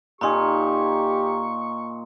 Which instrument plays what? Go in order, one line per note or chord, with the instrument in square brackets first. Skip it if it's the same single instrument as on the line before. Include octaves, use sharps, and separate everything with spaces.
[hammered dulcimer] A#2 D#4 G#5 [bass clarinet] G4 [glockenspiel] A#5 C6 [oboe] C#6